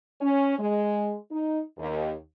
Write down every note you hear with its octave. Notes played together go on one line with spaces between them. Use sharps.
C#4
G#3
D#4
D#2